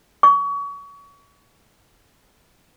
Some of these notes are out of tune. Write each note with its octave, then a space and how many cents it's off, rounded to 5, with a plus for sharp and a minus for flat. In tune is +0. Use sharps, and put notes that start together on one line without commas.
C#6 +30